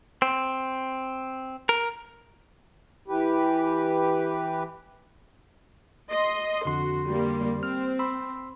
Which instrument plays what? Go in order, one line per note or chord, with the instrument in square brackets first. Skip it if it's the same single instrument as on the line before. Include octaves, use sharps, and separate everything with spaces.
[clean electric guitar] C4
A#4
[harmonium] E3 G4 B4
[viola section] D#5 C6
[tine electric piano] F2 D3 C6 [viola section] F#4
[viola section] G3 A#3
[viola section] C4 [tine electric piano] F6
[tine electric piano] B5 C6 E6